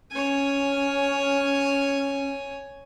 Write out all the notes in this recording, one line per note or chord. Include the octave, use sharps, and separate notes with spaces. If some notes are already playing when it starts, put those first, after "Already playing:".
C#4 C#5 G#5